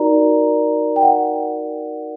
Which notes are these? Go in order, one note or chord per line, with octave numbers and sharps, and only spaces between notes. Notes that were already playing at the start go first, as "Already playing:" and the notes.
Already playing: D#4 F#4 A#4 D5 A#5
G5
F#5